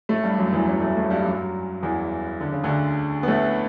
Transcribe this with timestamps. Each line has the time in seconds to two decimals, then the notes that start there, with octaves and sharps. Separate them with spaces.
0.09 A2 A3
0.23 G2 G3
0.38 F#2 F#3
0.52 E2 E3
0.67 F#2 F#3
0.81 A2 A3
0.96 A2 A3
1.10 G2 G3
1.24 F#2 F#3
1.82 E2 E3
2.40 D3
2.52 C#3
2.64 D2 D3
3.23 B3
3.28 A2 A3